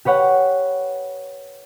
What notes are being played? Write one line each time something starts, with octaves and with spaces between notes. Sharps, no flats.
G4 B4 C#5 F#5